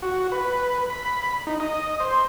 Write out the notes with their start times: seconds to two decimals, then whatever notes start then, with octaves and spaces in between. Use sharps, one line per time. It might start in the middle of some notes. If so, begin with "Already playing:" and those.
0.02 F#4
0.32 B4
0.90 B5
1.47 D#4
1.60 D#5
2.00 C5